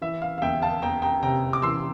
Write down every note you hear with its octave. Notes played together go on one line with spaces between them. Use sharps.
E3 E5
F5
F5
E2 E5 G5
F5 A5
E2 G5 A#5
G5 A#5
C3 G5 A#5
D6
E3 C6 E6